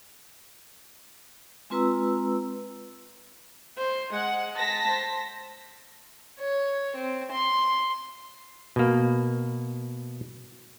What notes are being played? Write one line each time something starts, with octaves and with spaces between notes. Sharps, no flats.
G#3 C4 F4 B4 A#5 E6
C5
G#3 F#5
A5 A#6 B6
C5
C#5
C4
C6
B2 A#3